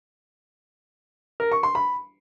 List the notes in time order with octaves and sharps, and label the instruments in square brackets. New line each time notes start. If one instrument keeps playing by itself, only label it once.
[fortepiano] A#4
C#6
C6
B5